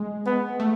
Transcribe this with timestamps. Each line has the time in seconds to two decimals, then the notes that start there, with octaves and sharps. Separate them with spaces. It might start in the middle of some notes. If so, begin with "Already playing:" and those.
Already playing: G#3
0.26 B3
0.60 A3